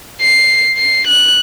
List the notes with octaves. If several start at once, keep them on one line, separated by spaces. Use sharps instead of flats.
C7
C7
F#6